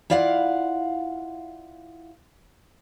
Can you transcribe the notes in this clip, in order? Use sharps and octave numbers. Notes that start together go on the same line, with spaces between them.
E4 F4 D5 F5 F#5